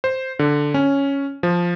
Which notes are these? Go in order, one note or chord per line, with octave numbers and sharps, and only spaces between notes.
C5
D3
C#4
F3